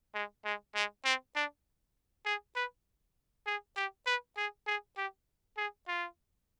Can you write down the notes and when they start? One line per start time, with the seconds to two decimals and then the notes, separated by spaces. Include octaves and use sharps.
0.15 G#3
0.45 G#3
0.75 G#3
1.05 C4
1.35 D4
2.25 G#4
2.56 B4
3.46 G#4
3.77 G4
4.07 B4
4.37 G#4
4.67 G#4
4.97 G4
5.57 G#4
5.88 F4